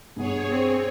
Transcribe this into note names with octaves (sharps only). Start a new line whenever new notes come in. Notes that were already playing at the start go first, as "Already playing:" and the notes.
G2 B2 G#4 C#5 F#5
C4